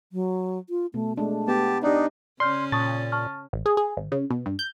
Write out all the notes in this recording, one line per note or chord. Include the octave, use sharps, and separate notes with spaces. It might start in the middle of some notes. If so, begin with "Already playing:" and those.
F#3
F4
B2 A3
G#3 A3 D4
B3 G4 A5
D4 D#4 G4 D5 D#5
C#3 C#4 D5 C6 F6 G6
A#2 A5 C#6 D#6 A6
A5 C#6 F6
A1
G#4
G#4
G#1
C#3
B2
G2
G6